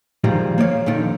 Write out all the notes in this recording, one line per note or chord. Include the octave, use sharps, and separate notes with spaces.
A#2 D#3 F3 G3 G#3 A#3
A#3 C#5 D5 F5
A#2 D3 D#3 F3